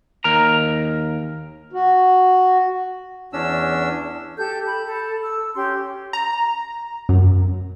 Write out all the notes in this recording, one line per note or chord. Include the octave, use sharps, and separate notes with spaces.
D#2 A#4 A#5
F#4
E2 C#4 D4 E6
G4 A4 G6
B5
A4
E6
C#4 G4 C6
A#5
F#2